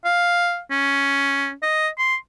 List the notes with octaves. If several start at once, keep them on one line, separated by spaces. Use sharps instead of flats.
F5
C#4
D#5
C6